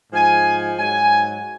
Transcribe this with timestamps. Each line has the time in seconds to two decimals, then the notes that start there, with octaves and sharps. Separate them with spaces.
0.12 G#2 F3 G#5
0.77 G#2 F#3 G#5